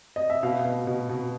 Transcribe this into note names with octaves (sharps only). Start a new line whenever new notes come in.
D#5
E5
B2 F5
B2
B2
B2